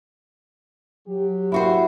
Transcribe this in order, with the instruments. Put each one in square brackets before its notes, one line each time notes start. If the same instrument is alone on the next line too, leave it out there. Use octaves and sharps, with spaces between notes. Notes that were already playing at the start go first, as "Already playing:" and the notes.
[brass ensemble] F#3 G4
[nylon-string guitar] E4 F#4 C5